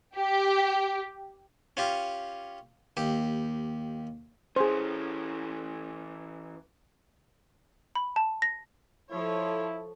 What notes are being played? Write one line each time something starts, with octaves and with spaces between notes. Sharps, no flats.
G4
C#4 F4 G4
D#2 G4
E3 C#4 G#4 C5
B5
A5
A#6
F3 E4 A4 C#5